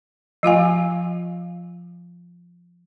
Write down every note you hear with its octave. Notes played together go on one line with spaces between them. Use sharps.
F3 F4 F5 G#5